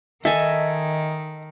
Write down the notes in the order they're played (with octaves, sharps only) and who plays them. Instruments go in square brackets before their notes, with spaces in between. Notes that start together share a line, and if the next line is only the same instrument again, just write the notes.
[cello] D#3 [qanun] A4 G#5 [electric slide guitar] D#5 E5